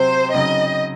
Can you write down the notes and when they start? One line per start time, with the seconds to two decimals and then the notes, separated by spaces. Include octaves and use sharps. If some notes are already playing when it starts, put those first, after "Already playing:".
Already playing: C3 F#3 C4 C5
0.34 C#3 F#3 C4 D#4 D#5